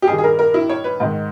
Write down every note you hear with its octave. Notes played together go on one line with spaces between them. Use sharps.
G4
G2 D#3 G#4
G#4
A#4
A#4
E4
C#5
B4
G#2 D#3